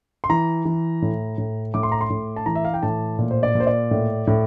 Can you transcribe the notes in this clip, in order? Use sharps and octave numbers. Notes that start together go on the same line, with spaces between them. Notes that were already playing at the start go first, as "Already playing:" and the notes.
C6
E3 A#5
E3
A2
A2
A2 D6
C6
A#5
C6
A2
A5
E3 A#5
E5
F5
G5
A2 A5
A#2
C5
D5
A#2
C5
D5
A2
A2